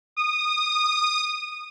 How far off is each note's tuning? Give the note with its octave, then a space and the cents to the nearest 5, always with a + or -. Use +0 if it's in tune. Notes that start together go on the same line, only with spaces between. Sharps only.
D#6 -20